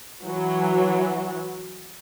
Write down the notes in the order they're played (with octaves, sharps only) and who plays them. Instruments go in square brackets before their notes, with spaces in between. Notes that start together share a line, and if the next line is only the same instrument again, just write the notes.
[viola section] E3 F#3